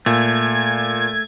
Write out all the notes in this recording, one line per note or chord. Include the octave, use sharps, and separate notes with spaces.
A#2 A3 G#6